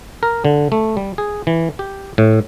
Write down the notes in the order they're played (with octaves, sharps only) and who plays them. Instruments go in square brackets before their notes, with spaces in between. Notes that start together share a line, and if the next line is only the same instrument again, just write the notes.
[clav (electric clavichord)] A#4
D3
A3
G3
G#4
E3
G4
A2